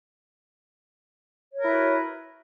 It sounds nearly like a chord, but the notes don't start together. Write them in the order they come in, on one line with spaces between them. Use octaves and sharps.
C#5 A#4 E4 B4 F#4